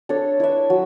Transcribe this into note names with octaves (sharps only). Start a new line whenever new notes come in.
D4 A4 C#5
E4 B4 E5
F#3